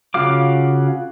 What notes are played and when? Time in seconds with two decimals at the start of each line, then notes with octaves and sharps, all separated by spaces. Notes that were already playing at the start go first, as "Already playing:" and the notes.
0.14 C#3 F4 F#4 F5 D6